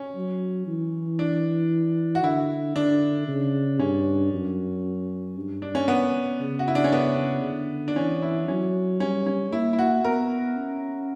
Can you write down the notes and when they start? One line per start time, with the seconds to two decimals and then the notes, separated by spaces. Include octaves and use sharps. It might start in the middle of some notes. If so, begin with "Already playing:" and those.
Already playing: C#4
0.15 F#3
0.67 E3
1.19 D4
2.15 F#4
2.23 D3 E4
2.76 D3 D4
3.28 C#3
3.79 G2 C#4
4.32 F#2
5.36 G2
5.62 D4
5.75 C#4
5.88 B3
6.40 C#3
6.59 F#4
6.68 E4
6.75 D4
6.84 C#4
6.92 B3
7.44 D3
7.88 D4
7.96 E3 C#4
8.22 E4
8.48 F#3 C#4
9.00 G3 C#4
9.26 C#4
9.52 A#3 E4
9.73 E4
9.79 F#4
10.04 B3 A#4
10.56 C#4